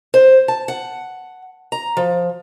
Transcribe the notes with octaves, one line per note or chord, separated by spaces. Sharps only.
C5
A5
F#5
A#5
F3